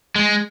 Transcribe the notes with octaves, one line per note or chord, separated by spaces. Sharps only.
G#3